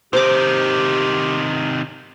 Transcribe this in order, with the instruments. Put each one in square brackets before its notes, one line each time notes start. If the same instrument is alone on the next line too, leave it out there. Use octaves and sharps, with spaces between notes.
[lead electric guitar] C3 D#3 [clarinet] G4 [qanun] C5 A#5 D6